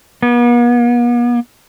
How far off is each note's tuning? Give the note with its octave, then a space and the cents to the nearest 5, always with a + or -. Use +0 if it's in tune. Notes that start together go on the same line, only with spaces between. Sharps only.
B3 -45